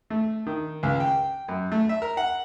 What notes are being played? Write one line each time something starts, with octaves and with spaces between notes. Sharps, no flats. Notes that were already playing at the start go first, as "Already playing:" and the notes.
A3
D#3
C#2
G5
F#2
A3
E5
A#4
F#5